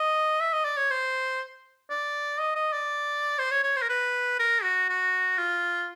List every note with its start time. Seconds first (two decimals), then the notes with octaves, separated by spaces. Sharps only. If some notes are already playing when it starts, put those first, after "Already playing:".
Already playing: D#5
0.41 E5
0.53 D#5
0.65 D5
0.77 C#5
0.90 C5
1.90 D5
2.40 D#5
2.55 D#5
2.73 D5
3.38 C5
3.51 C#5
3.63 C#5
3.76 C5
3.82 A#4
3.89 B4
4.39 A#4
4.63 F#4
4.89 F#4
5.38 F4